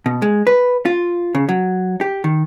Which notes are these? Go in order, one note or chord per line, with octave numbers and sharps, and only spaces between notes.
B2
G#3
B4
F4
C#3
F#3
G4
D#3